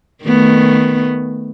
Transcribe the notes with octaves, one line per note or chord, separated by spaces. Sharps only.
D#3 A3 B3